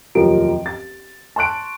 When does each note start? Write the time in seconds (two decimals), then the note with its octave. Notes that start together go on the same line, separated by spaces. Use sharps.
0.15 F1 D#2 F3 F#3 A#4 D7
0.66 A6
1.36 A5 C6 C#6 F#6 D7